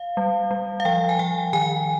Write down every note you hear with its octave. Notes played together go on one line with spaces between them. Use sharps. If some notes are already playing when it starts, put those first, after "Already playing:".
Already playing: F5
G3
G3
F5
F3 G5
G#5
F3 G5
D#3 G#5